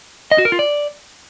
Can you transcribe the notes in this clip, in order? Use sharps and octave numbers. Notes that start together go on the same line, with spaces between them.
D#5
F#4
A#4
F4
D5